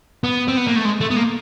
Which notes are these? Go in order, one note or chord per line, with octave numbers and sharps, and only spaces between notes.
B3
C4
B3
A#3
A3
G#3
A3
B3
A#3